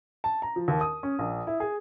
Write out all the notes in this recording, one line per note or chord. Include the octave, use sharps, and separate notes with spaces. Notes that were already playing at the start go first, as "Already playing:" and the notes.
A5
A#5
F3
D#2
D#6
C#4
A#1
E4
G#4